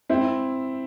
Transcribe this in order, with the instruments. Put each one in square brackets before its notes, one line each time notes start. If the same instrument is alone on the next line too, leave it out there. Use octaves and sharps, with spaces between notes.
[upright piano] C4 E4